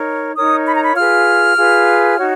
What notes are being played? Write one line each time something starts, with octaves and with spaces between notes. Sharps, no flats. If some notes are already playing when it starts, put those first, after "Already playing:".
Already playing: D#4 A#4 C#5
D#4 A#4 C#5 D#6
B5
A#5
B5
F4 G#4 B4 F6
F4 G#4 B4
D#4 F#4 C#5